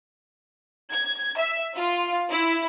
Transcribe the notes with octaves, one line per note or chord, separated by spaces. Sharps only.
G#6
E5
F4
E4